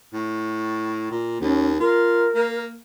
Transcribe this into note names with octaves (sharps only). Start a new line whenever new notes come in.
A2
A#2
D#2 C#4
F4 A#4
A#3